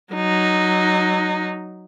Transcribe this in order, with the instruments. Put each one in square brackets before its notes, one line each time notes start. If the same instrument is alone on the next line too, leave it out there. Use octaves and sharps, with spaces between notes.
[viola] F#3 D#4